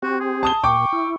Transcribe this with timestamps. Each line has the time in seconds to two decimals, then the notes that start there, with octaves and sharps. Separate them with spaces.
0.03 C4 F#4 G4
0.20 G#4
0.43 A5 D#6 G7
0.64 A#2 G5 C#6 D6
0.93 E4